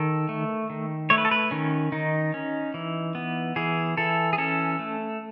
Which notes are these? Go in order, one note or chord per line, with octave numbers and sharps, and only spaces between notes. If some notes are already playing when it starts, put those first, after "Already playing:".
Already playing: D#3 A4
A3
D#3
A3 C#5
B4
A4
B4
D#3 C#4
D#3 D#4
C#4
E3
B3
E3 G#4
E3 A4
G#4
C#4 A4
A3